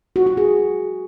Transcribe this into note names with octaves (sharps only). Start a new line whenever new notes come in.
F#4
F#4
G#4